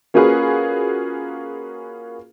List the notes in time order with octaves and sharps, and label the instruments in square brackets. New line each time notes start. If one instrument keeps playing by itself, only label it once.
[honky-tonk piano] A#3 C#4 F4 F#4 G#4 B4